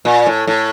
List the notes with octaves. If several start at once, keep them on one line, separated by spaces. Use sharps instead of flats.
A#2
A2
A2